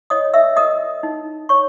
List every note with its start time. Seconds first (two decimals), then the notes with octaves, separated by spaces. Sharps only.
0.10 C#5 D#5 D#6
0.34 E5 E6
0.56 A#4 D#5 D#6
1.03 D#4
1.49 C#5 C#6